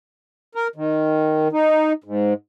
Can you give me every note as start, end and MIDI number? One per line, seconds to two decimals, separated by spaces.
0.55 0.68 70
0.76 1.48 51
1.52 1.93 63
2.04 2.34 44